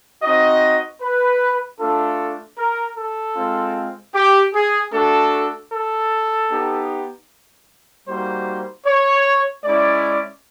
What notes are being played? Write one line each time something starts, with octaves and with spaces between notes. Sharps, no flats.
C4 D#4 F#4 D#5
B4
A3 D4 F4 A4
A#4
A4
G#3 C4 F4
G4
G#4
A3 D4 F#4 A4
A4
B3 D#4 G4
G3 A#3 D#4 F#4 C5
C#5
G#3 C#4 E4 D5